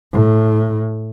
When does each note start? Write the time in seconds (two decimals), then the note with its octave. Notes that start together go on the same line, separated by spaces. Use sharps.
0.13 A2